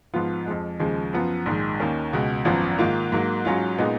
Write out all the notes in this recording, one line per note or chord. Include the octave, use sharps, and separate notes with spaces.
G#2 F3 B3 F4
F2 F3 G#3
D#2 C#3 F3 G#3
F#2 F3 B3 F4
A#1 G#2 D#3 G#3
D#2 D#3 A#3 C#4
C#2 B2 G#3
G#1 F#2 F3 B3 F4
G#2 D#3 A#3 F4
G#2 F#3 A#3
G#2 F#3 C#4 F4
A#2 G#3 B3 D#4